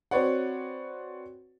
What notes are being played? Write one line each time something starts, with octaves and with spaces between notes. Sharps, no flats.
C4 F#4 B4 C#5 D5 F#5